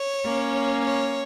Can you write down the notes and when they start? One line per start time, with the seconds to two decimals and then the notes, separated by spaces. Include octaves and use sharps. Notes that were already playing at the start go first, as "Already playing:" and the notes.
Already playing: C#5
0.24 A#3 C#4
0.85 C#5